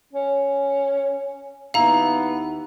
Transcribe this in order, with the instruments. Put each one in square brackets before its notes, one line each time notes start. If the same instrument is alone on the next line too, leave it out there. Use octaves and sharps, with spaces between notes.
[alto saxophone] C#4
[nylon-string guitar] D#2 E4 [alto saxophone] B3 [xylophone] F5 A#5